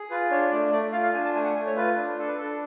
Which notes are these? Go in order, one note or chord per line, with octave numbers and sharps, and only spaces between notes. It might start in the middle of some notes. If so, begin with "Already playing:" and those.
Already playing: G#4
F4 B4
D4 C#5
C#5
A3 D5
A3 D5
F4 F5
F5
D4 G#5
A5
A3 G#5
F#5
A3 G#5
C#5
F4 B4
D4
D4 A4
B4
D4 A4